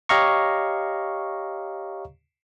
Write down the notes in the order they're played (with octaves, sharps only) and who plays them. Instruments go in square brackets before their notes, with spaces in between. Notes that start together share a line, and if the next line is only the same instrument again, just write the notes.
[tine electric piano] G4 C#5 D#5 F5 A#5 C#6